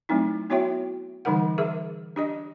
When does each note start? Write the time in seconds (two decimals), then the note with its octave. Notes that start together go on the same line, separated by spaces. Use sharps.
0.09 F#3 A3 C4 D#4 E4
0.50 B3 E4 F#4 C#5 E5 G5
1.25 D3 E3 G3 D#4 A#4 F#5
1.58 G#4 A#4 E5
2.16 D4 G4 D#5